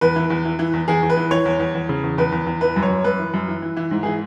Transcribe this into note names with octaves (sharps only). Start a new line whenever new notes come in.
E2 B4
E3
E2
E3
E3
E2
E2 G#4
E2
B4
E3
E3 C#5
E2
E2
E2
C#3
E2
E2 B4
E2
E2
E3 B4
F#2
C#5
F#2
F#2 B4
E3
F#2
E3
E3
E3
G#2
E3 G#4